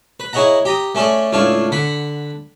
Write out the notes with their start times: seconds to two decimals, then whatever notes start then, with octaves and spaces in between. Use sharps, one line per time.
0.20 B4
0.33 E4 G#4 C#5 D#5 F#5 A#5
0.65 G4 A#5 D#6
0.95 A3 C#4 G#4 A4 D5
1.33 C#2 A2 D4 C#5 F5
1.72 D3 F#5 B5